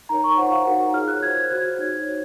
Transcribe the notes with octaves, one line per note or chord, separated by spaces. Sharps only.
D#4 A#4 C#5 A#5
C#6
F4 C5 F#5
F5
D#4 F#4 A#4 F#5
F4 G#4 C#5 F6
F#6
F4 C5 G#6
G#6
F#4 C5 G#6
D#4 F#4 C#5
F#4 C5